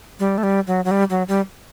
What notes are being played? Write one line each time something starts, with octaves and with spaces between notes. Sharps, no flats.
G3
A3
G3
F#3
F#3
G3
F#3
G3